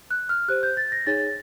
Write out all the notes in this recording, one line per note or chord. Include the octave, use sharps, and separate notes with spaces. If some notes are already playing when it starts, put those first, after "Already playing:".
F#6
F6
G4 C5 F#6
G6
A6
A#6
D#4 G#4 C#5 A6